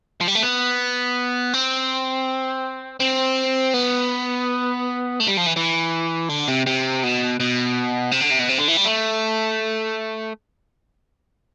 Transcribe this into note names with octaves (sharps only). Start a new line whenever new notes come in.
F3
G3
A3
B3
C4
C4
B3
A3
G3
F3
E3
E3
D3
C3
C3
B2
B2
C3
D3
C3
B2
C3
D3
E3
G3
A3